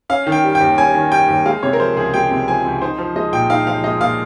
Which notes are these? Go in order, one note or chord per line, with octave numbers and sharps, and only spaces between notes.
C#4 F5
D#3
G5
G3
G5
D#2
C#4 G#5
D#3
G3 G5
D#2
G#3 F5
C3 C#5
A#4
F3 C5
C#2 G#4
G#3 G5
C3
F3 G#5
C#2
D#4 C5
F3
G#3 D#5
A#2 G5
D#4 F5
F3 F5
G#3 D#5
A#2 F5